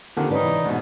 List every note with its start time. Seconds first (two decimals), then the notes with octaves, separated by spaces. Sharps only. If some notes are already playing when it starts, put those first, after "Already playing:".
0.17 F2 D3 D#3 A#3 G4 A4
0.31 G#2 C#4 D#4 B4 D5
0.43 C3 E3
0.65 G#2 B2